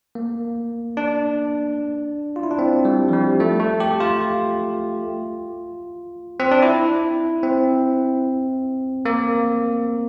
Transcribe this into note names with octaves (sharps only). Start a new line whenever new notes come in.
A#3
D4
F4
E4
D4
C4
G3
F3
G3
A3
A3
G4
F4
C4
D4
E4
C4
A#3